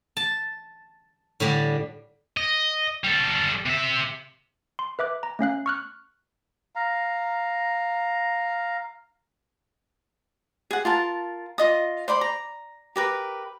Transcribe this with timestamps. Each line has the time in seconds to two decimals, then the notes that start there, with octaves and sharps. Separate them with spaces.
0.17 A5
1.40 A2 D3 G3 D4
2.37 D#5
3.04 G3 A4
3.66 C3 E5
4.79 C6
4.99 B4 E5 D6 F#6
5.23 A#5
5.39 A3 C#4 F5 F#6
5.66 C#6 F6 F#6
6.76 F5 A#5
10.71 G#4 F#5
10.85 F4 A#4 A5
11.58 F4 D#5 D#6
12.08 C5 D5 B5 C6
12.21 A#5
12.96 G4 A#4 B4